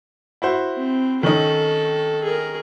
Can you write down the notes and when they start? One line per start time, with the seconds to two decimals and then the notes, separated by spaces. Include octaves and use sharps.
0.42 E4 F#4 C5
0.75 C4
1.23 D#3 C#4 D#4 A4
2.24 G#4 A#4